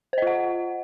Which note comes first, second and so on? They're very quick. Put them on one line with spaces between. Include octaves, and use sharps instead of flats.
C5 D#5 F4 F#5